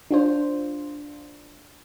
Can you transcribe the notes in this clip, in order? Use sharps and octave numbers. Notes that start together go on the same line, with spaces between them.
D4 F4 C5